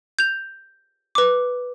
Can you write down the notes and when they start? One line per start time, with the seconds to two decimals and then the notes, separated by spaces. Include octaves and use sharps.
0.19 G6 F7
1.15 B4 D6